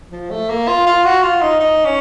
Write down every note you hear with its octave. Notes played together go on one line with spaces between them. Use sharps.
F3
A3
A#3
F4
F4
F#4
F4
D#4
D#4
C#4